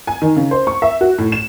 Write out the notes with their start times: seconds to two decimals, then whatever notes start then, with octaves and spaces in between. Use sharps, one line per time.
0.07 G#5
0.22 D#3
0.36 C#3
0.51 C5
0.67 C#6
0.82 E5
1.01 F#4
1.18 A2
1.32 E7